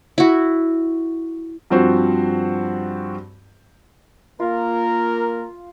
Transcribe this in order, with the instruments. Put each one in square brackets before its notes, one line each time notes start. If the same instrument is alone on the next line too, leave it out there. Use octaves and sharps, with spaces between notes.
[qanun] E4 F#4
[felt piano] G2 F3 C4 F#4 C5
[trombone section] A#3 A#4 [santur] F4